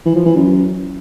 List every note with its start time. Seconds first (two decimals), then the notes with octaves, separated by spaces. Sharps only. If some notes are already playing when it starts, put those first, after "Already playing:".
0.05 E3
0.16 F3
0.26 E3
0.36 F#2